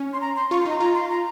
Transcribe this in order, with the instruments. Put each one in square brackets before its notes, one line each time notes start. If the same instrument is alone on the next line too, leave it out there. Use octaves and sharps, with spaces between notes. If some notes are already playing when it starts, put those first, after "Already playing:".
Already playing: [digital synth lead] C#4
[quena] C6
A#5
C6
[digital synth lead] F4 [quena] C#6
[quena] C6
[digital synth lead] D#4 [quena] A#5
[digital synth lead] F4 [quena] A#5
[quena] C6
A#5